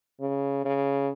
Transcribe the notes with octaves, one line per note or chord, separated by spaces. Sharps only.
C#3
C#3